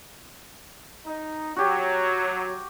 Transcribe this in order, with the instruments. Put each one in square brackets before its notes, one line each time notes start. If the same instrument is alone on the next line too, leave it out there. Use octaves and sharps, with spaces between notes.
[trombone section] D#4
[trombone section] F#3 [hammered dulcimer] F#4 G4